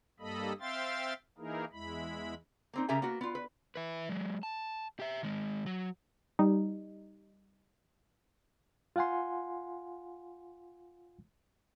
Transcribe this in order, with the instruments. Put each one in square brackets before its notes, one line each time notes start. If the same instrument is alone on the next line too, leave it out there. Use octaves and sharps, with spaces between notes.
[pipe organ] G2 G3 A#3 A4 D#5 B5
C4 E5 F5 G5 C6 A6
E3 A#3 D#4 E4 G#4 A#4
E2 G#3 E4 B5
[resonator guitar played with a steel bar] A#3 C4 D#4
C#3 G4 A#4 E5 G#5 A#5
A#3 B3 F#4
B3 F4
B4
[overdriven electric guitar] E4 B4
F#3 G#3
A5
G4 E5
D#3 G#3
F#3
[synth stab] G3 D#4
[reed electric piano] F4 F5 F#5 G#5 C6